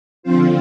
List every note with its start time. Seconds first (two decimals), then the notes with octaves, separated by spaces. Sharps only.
0.23 D3 F3 C4 F4 C5